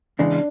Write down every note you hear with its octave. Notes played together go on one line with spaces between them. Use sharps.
E2 C#3 E3 G#3 D4